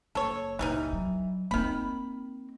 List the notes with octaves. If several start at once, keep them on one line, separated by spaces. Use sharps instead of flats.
F#1 A4 C#5
C#2 A#2 E3 G3 D#4
F#3
D#3 A#3 C4 B5